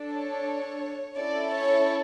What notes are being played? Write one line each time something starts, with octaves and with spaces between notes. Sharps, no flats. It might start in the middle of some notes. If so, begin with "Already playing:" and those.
Already playing: D4 A4
C#5
C#4 E4 A4 D5
C#5